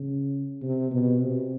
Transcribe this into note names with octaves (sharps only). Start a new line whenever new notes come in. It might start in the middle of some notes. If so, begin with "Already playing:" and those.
Already playing: C#3
C3
B2
C3